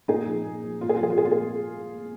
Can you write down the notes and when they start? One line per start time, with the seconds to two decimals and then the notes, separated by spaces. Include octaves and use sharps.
0.08 A#2 D#4 G#4
0.27 F3
0.45 A#2
0.64 F3
0.81 A#2 F4
0.89 G#4
0.96 F4
1.00 F3 G#4
1.10 F4
1.18 A#2 G#4
1.25 F4
1.32 G#4